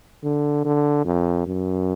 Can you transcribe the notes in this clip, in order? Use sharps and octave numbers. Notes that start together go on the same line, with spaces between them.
D3
D3
F2
F#2